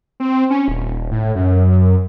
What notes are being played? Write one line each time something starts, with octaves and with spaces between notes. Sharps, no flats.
C4
C#4
D#1
A2
F#2